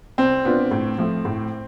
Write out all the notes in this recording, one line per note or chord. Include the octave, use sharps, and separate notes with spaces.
C2 C4
B2 B3 D4 F4
A2
F3 A3
A2